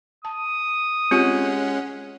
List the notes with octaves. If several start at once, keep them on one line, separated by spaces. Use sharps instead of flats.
A5 D#6
G#3 C4 C#4 F4 G4 F#5